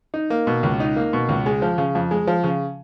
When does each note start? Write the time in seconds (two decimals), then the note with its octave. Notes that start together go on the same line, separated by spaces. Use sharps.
0.14 D#4
0.30 A#3
0.47 B2
0.63 C#2
0.80 D#4
0.96 A#3
1.13 B2
1.29 C#2
1.46 G#3
1.62 F3
1.78 C#3
1.95 F2
2.11 G#3
2.27 F3
2.44 C#3